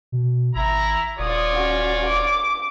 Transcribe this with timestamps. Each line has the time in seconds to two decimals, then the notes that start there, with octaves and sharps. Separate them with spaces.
0.12 B2
0.55 G#1 E4 A#5
1.19 D#1 F4 C#5 D5 D#6
1.52 C#4 F#4
2.06 D6